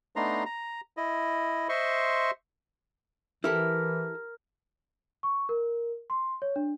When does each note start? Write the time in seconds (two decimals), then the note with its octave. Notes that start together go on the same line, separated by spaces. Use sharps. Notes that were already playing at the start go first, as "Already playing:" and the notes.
0.16 A3 B3 D4 D#4 A#5 C6
0.46 A#5
0.97 E4 D#5
1.69 C5 D#5 E5 C6 C#6
3.44 E3 E4 G4 A4 A#4
5.23 C#6
5.49 A#4
6.10 C6
6.42 C#5
6.56 D4